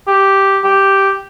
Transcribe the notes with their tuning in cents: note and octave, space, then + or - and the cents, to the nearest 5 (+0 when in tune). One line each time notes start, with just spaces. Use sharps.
G4 -5
G4 -5